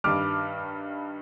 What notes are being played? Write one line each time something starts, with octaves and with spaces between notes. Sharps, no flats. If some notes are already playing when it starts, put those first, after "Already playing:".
G2 D#3 G3 D6 F6